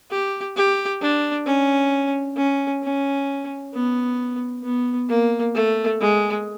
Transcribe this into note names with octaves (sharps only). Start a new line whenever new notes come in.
G4
G4
D4
C#4
C#4
C#4
B3
B3
A#3
A3
G#3